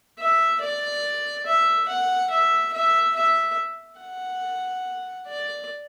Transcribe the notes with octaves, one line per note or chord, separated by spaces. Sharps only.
E5
D5
E5
F#5
E5
E5
E5
F#5
D5